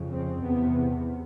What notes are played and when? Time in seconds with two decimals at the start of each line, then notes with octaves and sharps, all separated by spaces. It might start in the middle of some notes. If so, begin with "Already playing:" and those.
Already playing: F2 C#3
0.12 C4
0.42 E2 C3 B3